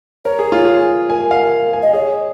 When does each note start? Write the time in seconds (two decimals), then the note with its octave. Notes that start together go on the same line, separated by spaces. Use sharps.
0.25 A#4 C#5
0.39 G#4
0.52 F4
0.65 G#4
1.10 A#4 G#5
1.31 F5
1.73 G#5
1.82 D#5
1.93 G#4 C#5